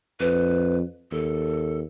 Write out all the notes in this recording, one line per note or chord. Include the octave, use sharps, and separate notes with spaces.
F2 B4
D#2 A4